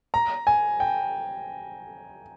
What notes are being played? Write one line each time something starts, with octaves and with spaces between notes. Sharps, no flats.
A#5
G#5
G5